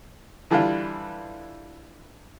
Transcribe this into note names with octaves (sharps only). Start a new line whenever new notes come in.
D3 E3 G3 D4 E4 F4